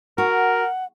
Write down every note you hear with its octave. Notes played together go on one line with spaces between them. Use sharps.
F#4 A#4 F#5